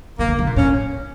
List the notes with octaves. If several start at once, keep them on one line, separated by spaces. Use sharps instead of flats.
C#3 A#3
D3
C#3
A#2
A2 C#4